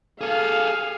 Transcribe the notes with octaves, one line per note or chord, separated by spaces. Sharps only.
G#4 A4 F5